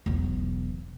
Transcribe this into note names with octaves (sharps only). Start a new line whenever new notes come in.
E1 B1